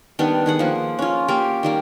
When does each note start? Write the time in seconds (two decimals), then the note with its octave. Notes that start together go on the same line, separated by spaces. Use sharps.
0.19 D#3 G3 B3 D4
0.46 D#3 G#4 F#5
0.59 F3 A#3
0.99 C#4 F4
1.28 A#3 G4 F5
1.63 D#3 G3 A#3